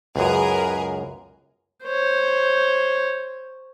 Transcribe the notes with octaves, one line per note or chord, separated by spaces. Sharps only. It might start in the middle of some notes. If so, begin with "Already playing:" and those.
C#2 F#2 G#4 A#4 B4
C5 C#5